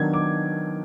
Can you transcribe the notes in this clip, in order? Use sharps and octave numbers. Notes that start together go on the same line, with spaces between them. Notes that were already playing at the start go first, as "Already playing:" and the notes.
Already playing: D#3 F#3 B3 D4 G#6
D6